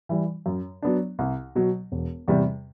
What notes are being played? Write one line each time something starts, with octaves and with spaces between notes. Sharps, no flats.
E3 G3
F#2
F#3 B3 D4
C2
B2 F#3
E1
E2 C3 G3